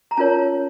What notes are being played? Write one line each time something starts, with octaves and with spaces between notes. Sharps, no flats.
A#5
C#4 F4 A#4 C#5 A5